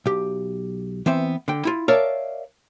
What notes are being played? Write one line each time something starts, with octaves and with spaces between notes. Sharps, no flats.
B1 G4
E3 B3 C4 E5
D3 G5
E4 F4
A#4 C#5 D5 E5 F5 A5